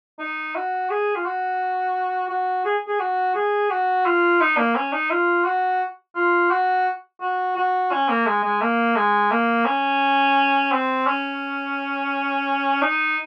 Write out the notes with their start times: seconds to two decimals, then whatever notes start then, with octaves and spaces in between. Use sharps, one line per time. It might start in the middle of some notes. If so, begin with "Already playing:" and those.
0.19 D#4
0.55 F#4
0.90 G#4
1.16 F4
1.26 F#4
2.30 F#4
2.65 G#4
2.87 G#4
3.00 F#4
3.35 G#4
3.70 F#4
4.06 F4
4.41 D#4
4.57 A#3
4.76 C#4
4.93 D#4
5.10 F4
5.45 F#4
6.16 F4
6.51 F#4
7.21 F#4
7.57 F#4
7.92 C#4
8.09 A#3
8.26 G#3
8.44 G#3
8.62 A#3
8.96 G#3
9.31 A#3
9.66 C#4
10.72 C4
11.07 C#4
12.82 D#4